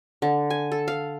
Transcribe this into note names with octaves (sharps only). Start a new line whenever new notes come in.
D3
G#5
A4
F5